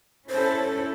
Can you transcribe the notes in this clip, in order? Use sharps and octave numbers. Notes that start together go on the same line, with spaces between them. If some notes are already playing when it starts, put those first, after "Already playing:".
C#4 E4 A4 C5